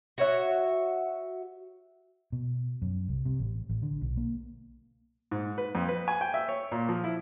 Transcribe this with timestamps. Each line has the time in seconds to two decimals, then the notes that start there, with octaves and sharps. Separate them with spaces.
0.18 F#4 C#5 E5
2.32 B2
2.82 F#2
3.09 C2
3.25 C3
3.40 A1
3.69 A1
3.82 D3
4.01 B1
4.17 A#3
5.31 G#2
5.58 B4
5.75 F2
5.88 B4
6.08 G#5
6.21 G5
6.34 E5
6.49 C#5
6.72 A#2
6.89 F3
7.04 E4